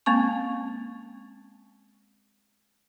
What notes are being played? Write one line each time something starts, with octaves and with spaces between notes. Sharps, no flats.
G#3 A#3 C4 C#4 C#6